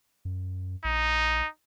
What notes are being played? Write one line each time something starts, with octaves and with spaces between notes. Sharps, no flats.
F#2
A#1 D#4